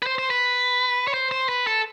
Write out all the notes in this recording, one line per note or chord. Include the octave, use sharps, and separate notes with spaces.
B4
C5
C5
B4
C#5
C5
C5
B4
A4